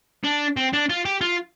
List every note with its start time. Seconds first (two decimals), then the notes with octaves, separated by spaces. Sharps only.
0.24 D4
0.57 C4
0.73 D4
0.89 F4
1.05 G4
1.21 F4